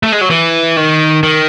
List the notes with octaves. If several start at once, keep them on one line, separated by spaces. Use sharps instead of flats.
A3
G#3
F#3
E3
D#3
D#3